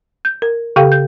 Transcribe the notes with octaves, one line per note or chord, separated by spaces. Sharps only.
G6
A#4
C#3 G4 A4 F5 G5
G6